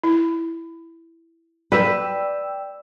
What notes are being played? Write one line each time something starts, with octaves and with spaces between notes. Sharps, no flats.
E4
B4 D5 G5 E6